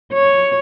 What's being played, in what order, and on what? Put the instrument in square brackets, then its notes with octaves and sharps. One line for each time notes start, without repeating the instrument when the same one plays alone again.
[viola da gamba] C#5